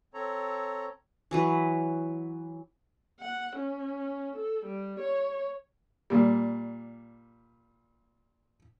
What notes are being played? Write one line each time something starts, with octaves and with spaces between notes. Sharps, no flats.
C4 A4 C#5 A#5
E3 F#3 B4
F#5
C#4
A4
G3
C#5
A#2 G3